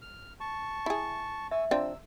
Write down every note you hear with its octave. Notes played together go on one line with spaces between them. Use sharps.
F6
A5 C#6
E4 G#4
E5 G#5 C#6 E6
C3 F3 C4 D4 E6